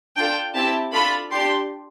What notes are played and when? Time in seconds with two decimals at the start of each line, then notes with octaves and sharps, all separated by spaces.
0.16 D4 F4 A4 G5
0.55 C4 E4 G4 A5
0.93 D4 F4 A4 B5
1.31 D4 G4 C6